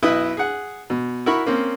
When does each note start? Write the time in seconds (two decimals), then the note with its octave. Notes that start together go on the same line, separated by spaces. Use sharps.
0.03 B1 E4 B4 D#5 D#6
0.37 G#4 F#5
0.90 B2
1.26 E4 F#4 A#4 B5 C#6
1.46 A#3 C4 C#4